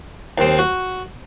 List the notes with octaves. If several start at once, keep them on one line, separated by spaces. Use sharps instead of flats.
D#2 C4
F#4